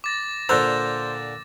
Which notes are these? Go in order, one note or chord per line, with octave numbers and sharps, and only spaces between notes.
D6 A6 A#6
A#2 D3 C5 F5 E6 F#6 A6 A#6